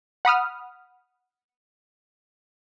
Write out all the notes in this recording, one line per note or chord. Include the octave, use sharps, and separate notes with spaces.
F#5 B5 D#6 F6